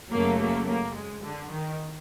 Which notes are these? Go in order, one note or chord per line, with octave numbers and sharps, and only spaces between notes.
F#2 C#3 F#3 A3 A#3
A#3
A#3
G#3
D3
D#3